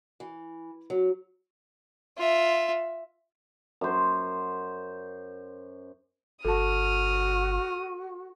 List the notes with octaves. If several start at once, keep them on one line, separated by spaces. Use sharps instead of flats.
E3
F#3
F4 E5
F#2 C5
G1 F#4 A4 A5 D#6 F6